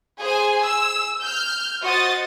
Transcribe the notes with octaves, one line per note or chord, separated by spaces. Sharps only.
G#4 C5 G#5
E6
F6 G6
F#4 C5 D#5 D#6 A6